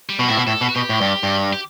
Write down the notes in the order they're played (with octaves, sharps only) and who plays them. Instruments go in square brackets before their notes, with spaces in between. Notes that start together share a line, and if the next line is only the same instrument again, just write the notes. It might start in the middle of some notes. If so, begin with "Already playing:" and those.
[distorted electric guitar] G3
[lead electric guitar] B2
[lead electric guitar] A2 [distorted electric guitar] E4
[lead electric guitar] B2
[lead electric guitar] A2 [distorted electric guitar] A4
[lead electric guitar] B2
[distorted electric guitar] F#4
[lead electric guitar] B2 [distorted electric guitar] G4
[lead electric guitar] A2
G2
G2
[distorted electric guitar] G4